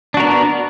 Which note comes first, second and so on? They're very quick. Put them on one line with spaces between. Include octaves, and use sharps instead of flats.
D4 F#4 A#4 B3